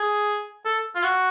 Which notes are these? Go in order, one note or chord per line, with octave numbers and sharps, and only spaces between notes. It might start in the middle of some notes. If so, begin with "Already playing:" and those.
Already playing: G#4
A4
F4
F#4